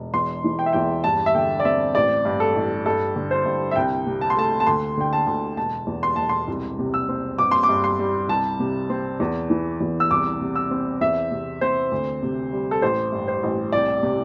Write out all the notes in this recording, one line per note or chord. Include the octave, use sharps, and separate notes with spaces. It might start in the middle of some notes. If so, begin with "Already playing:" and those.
Already playing: E1
E2 C6
E3
G5
E5
E2 G5
G2 A5
E5
D3 G5
D5
C4 E5
A1 D5
G2
A4
A1
G2 A4
D3
C5
G2
E5
C2 G5
C3
A5
C6
A3 A5
A5
D2 C6
D3 G5
A5
D2
E1 A5
E2
C6
E1 A5
C6
C2
C3
E6
C4
G1 D6
C6
D6
G2
C6
G3
C2 A5
C3
C4
E2
E3
E2
E6
C2 D6
C3
E6
C4
E2 E5
C3
C4 C5
D2
C3
G3
A4
A1 C5
G2
C5
A1
C2 D5
C3